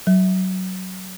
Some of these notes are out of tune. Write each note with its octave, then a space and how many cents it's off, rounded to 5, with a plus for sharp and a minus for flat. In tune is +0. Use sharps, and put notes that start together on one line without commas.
F#3 +15